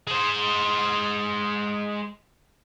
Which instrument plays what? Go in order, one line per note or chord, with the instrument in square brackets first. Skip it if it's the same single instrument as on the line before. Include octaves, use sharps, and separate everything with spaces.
[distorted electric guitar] G#3 C5